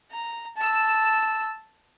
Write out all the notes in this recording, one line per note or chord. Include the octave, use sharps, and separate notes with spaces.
A#5
A5 E6